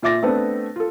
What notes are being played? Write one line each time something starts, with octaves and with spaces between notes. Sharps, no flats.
A#2 F4 E5 D6 A6 A#6
A3 B3 C4 D4 B4
F4 A4